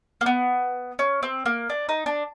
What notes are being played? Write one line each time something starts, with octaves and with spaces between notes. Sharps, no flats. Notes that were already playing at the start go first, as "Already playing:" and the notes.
A#3
B3
C#4
C4
A#3
D4
D#4
D4